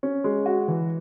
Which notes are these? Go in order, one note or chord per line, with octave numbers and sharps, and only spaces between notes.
C#4
G#3
F#4
E3